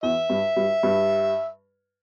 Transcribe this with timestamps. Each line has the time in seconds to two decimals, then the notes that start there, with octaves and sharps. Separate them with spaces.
0.03 E2 E3 E5
0.30 G2 G3
0.56 G2 G3
0.83 G2 G3